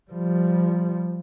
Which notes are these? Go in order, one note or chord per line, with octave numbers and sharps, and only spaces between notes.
F3 G3